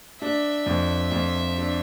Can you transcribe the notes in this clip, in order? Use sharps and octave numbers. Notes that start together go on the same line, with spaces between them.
D4 E5
F2
F2
D4